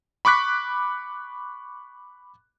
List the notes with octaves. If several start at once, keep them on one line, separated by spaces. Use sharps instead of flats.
B5 C#6 D6 F#6 B6